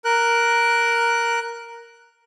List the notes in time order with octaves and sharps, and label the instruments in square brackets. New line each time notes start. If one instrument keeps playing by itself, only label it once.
[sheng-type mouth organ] A#4 F#6